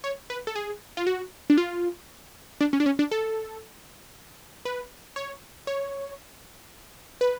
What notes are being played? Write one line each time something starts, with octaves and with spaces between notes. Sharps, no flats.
C#5
B4
A4
G#4
F4
F#4
D4
F4
D4
C#4
D4
C#4
D4
A4
B4
C#5
C#5
B4